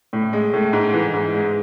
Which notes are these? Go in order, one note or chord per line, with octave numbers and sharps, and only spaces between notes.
A2
G#3
A2
G#2
E3
G#2
G#3